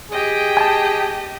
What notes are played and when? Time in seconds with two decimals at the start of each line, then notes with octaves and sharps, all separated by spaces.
0.11 G4 G#4 D#5 G5
0.57 G#5 A5